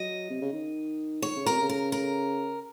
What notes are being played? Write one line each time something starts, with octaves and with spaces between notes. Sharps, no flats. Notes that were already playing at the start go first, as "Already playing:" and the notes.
Already playing: F#3 D#5
C3
C#3
D#3
D#3 C#5
C#3
C3 A#4
C#3
A#4
A#4